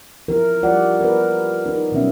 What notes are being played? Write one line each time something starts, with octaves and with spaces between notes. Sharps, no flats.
F3 E4 A#4
F3 G3 F4 D5 F#5
A#4 B4
D#4 A#4
B2 F#3 G3 C#4 E5